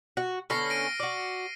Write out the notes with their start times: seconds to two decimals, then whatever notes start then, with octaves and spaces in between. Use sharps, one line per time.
0.17 F#4
0.50 D3 B3 C#4 F6 A#6 C7
0.70 A#6 D7 D#7
1.00 F#4 D5